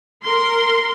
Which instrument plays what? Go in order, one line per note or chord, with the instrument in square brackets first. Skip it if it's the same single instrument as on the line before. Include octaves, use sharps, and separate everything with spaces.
[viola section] A#4 C6